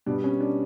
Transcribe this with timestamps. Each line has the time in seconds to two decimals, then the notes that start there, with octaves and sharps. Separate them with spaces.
0.06 B2 G3 B3 D4
0.24 C#4
0.40 D4